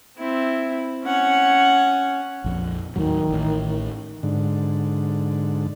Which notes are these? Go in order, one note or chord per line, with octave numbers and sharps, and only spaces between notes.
C4 E4
C#4 F#5
A#1 F2
D#2 A2 D#3 F#3
A1 A2
G#2 D3